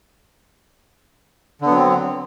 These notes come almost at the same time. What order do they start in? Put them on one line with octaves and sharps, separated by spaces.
D3 B3 F#3 C4